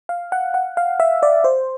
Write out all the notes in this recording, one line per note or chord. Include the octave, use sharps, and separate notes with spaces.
F5
F#5
F#5
F5
E5
D5
C5